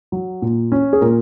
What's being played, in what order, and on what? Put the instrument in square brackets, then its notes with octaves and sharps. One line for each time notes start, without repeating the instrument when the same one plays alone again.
[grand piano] F#3
A#2
C#4
G#4
A#2 A#4